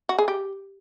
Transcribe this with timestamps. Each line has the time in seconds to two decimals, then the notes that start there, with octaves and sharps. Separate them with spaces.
0.09 F#4
0.18 G#4
0.28 G4